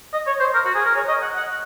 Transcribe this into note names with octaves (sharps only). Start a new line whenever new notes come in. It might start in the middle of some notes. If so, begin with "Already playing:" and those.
D#5
C#5
C5
A#4
F#4
G#4
A#4
C#5
D#5
F#5
F#5